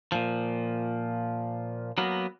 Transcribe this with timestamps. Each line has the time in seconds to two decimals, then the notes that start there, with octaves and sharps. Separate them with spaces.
0.12 A#2 F3
1.98 F#3 A#3 B3